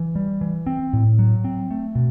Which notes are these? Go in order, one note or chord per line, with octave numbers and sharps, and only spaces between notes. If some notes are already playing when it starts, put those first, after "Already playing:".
Already playing: E3
G3
E3
C4
A2
F#3
C4
A3
B2